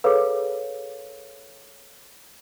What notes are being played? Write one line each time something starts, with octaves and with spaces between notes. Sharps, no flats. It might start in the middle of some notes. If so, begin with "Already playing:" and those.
G#4 A4 B4 C#5 F5